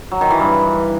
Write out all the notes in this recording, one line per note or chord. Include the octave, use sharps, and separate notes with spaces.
F#3
D#3
E3
G2